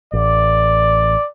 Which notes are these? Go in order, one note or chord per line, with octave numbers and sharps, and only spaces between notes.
A1 D5